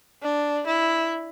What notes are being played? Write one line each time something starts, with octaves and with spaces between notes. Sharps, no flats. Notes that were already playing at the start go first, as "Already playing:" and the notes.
D4
E4